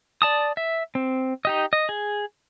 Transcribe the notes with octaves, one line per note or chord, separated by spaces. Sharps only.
D5 A5 D#6
E5
C4
D#4 G4 D#5
D#5
G#4